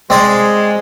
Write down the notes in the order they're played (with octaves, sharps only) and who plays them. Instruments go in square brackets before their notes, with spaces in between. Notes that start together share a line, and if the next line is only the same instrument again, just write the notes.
[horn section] G#3 [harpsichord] C4 D5 C6